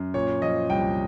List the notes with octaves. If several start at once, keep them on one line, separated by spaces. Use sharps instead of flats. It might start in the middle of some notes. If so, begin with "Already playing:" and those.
Already playing: F#2
A#2 C#5
F3 D#5
C2 G5